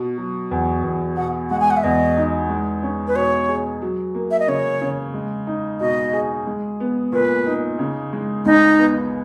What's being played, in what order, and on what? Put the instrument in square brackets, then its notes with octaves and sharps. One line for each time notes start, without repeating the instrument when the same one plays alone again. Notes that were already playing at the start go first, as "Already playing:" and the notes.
Already playing: [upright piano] B2
F#3
E2
E2
[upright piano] B2 [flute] F#5
[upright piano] G#3 [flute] F#5
[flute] G#5
F#5
E5
[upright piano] E2 [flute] D#5
[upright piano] D#4
G#3
C#4
[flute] B4
[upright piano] B2 [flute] C#5
[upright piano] G#4
F#3
A#3
[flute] E5
D#5
[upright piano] C#3 [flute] C#5
[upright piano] C#3
G#3
D#4
[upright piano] B2 [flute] D#5
[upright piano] G#4
G#3
B3
[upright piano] A#2 [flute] B4
[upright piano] D#4
C#3
G#3
[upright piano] C#2 [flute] D#4
[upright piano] B3